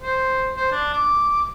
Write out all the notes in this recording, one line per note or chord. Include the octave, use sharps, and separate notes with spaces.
C5
C5
D4
D6